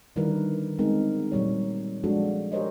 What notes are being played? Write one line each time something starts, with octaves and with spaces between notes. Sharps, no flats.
D3 D#3 G3 E4 A#4 B4
G#3 B3 C4 D#4 G#4 A#4
A#2 F#3 G3 C#5
F3 G#3 D4 F4 F#4 A4
G4 G#4 A#4 C5 C#5 D#5